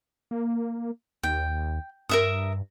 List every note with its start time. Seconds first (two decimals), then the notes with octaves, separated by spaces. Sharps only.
0.31 A#3
1.23 D#2 G5
2.09 G2 A#4 E5 D#6